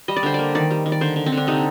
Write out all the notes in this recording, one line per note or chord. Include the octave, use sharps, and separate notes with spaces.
G3 D#5
D5
D3 C5
A#3 D5
D#3 D5
G3
D#3
D5
D3 C5
D3
C4
D3
D4
C3 D#4